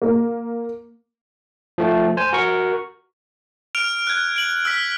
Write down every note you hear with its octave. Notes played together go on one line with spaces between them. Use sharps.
A#3
F3 A3
C5 G#5
F#4 A#4 C#6
F6 D7 F7
F#6 G#6
D7 F#7
E6 F6 B6